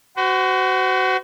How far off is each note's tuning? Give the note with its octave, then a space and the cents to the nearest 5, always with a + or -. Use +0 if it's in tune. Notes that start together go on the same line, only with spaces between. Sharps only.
F#4 +20 C5 -40